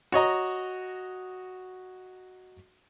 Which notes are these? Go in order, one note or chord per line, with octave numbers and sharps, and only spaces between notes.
F#4 C#5 D#5 A#5